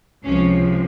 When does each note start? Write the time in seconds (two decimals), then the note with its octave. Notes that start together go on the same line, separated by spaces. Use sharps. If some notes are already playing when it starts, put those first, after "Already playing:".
0.24 C#2 C3 F3 C#4